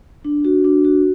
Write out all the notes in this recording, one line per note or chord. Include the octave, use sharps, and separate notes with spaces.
D4
F#4
D4
F#4